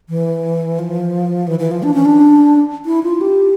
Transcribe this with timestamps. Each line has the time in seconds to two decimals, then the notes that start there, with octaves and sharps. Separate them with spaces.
0.09 E3
0.79 F3
1.47 E3
1.59 E3
1.71 F3
1.83 D4
1.94 C#4
2.05 D4
2.86 E4
3.03 F4
3.21 G4